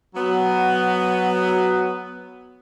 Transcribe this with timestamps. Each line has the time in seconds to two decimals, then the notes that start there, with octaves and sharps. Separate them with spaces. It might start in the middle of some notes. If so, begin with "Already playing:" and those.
0.15 F#3 B3